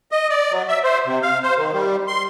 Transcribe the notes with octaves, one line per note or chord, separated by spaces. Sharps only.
D#5
D5
F#3
E5
C5
C3
F5
C5
D#3
G3
C6